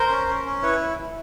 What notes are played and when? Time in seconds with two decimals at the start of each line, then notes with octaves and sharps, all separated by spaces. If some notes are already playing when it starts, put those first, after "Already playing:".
Already playing: A#4 C5
0.10 C#4
0.27 C#4
0.45 C#4
0.62 E4 B4 C#5